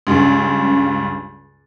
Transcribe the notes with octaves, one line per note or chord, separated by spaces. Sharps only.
C#2 G2 C#3